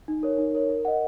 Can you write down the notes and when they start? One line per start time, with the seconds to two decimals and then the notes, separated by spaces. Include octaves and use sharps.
0.08 D#4
0.23 A#4 C#5
0.38 D#4
0.55 A#4 C#5
0.69 A#4
0.85 D#5 F#5